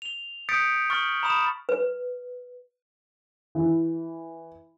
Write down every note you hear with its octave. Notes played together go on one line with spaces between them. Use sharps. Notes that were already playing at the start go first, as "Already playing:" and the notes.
F7 G7
D#6 G6 A6 B6 C#7 D7
C#6 F6 A6 F#7
A#5 B5 D#6 E7
B4
E3